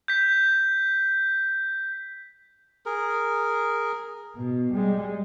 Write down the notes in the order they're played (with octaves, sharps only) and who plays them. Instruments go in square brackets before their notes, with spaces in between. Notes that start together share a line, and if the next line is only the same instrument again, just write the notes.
[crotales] G6 B6
[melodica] G#4 A#4
[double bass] B2
G3 G#3